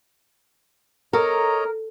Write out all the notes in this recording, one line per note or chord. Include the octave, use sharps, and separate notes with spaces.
A4 A#4 C#5 D#5 A#5